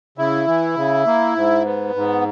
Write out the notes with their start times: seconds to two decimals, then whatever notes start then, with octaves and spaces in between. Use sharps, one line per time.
0.18 C#3 E4
0.47 E3
0.76 C#3
1.06 A#3
1.36 G#2
1.65 B3
1.95 G#2